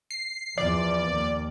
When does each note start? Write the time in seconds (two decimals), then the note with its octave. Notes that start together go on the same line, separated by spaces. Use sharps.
0.11 C7
0.58 E2 F3 D5
1.13 D#2